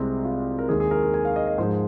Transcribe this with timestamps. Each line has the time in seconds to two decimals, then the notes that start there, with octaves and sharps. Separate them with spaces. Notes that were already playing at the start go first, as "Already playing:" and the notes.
Already playing: C2 C3 G#3 C4
0.24 F4
0.59 A#4
0.69 D#2 D#3 G#3 G#4
0.80 G#4
0.91 A#4
1.03 A#4
1.14 G#5
1.25 F5
1.36 D#5
1.47 D#5
1.58 G#2 F3 G#3 C5